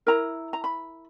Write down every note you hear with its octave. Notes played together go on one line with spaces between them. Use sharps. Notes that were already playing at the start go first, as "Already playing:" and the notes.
E4 A#4 A#5
A#5
B5